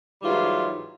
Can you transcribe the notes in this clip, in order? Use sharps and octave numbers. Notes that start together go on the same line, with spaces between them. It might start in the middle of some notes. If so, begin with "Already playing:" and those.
G#2 E3 F#3 G3 F4